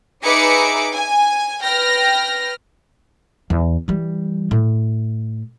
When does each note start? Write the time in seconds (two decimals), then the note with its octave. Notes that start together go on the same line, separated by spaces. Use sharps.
0.24 D#4 G#4 B4 E5 D6 C#7
0.94 G#5
1.63 B4 G5 F6 A#6
3.50 E2
3.88 E3 G3
4.51 A2